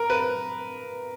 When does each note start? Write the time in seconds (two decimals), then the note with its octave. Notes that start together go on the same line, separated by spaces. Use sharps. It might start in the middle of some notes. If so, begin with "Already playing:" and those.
Already playing: A#4
0.10 B4